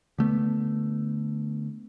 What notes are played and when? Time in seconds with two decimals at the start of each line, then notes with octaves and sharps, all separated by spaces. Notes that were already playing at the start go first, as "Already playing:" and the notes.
0.18 D3 A3 B3